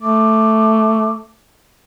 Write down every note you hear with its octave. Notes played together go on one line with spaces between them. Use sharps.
A3 D6